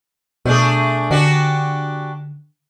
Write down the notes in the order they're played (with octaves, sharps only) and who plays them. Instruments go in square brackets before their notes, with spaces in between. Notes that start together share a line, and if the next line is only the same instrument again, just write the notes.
[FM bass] B2 [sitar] A3 D4 G#4
[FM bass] D3 [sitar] D4 F#4 G4